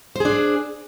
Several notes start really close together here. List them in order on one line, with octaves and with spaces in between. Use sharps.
C5 G#4 D4